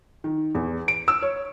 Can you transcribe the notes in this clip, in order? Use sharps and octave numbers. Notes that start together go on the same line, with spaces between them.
D#3
E2
D7
E6
C#5